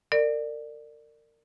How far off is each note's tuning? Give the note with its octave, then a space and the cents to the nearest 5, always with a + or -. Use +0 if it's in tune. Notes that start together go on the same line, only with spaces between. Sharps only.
A#4 -30 D5 +15